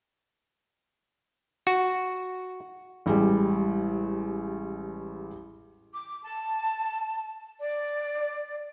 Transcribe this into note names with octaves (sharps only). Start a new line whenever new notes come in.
F#4
A1 G3 G#3
D6
A5
D5